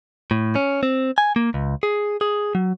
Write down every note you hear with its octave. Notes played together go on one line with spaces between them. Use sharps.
A2
C#4
C4
G#5
A#3
C#2
G#4
G#4
F#3